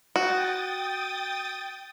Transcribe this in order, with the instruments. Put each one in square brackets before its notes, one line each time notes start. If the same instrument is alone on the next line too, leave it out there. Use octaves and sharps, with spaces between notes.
[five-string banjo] F#4 [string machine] G5 D#6 A6